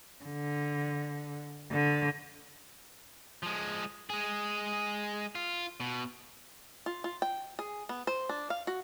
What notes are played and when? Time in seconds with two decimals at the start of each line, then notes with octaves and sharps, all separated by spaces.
0.25 D3
1.72 D3
3.43 F3 G#3
4.10 G#3 G#4
5.35 F4
5.80 B2
6.86 F4
7.04 F4
7.22 G5
7.59 G#4
7.89 B3
8.07 C5
8.29 D4
8.50 F5
8.67 F#4